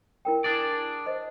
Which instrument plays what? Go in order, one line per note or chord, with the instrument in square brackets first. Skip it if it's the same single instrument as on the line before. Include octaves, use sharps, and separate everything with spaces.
[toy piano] E4 A#4 G5
[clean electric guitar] D4 G#4 D5
[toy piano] C5 D#5